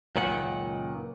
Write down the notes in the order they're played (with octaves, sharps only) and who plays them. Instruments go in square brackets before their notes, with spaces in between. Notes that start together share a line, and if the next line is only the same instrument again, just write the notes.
[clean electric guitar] C#2 F#2 A#2 D#3 F#5